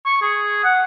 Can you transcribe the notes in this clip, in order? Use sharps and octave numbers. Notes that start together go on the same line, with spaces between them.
C#6
G#4
F#5